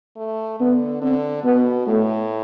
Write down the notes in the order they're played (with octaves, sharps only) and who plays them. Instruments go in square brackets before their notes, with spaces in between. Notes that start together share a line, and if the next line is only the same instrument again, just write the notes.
[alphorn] A3
[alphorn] D3 [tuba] B3
[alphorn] D3 [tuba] C4
[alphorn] B2 [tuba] B3
[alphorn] A2 [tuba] A3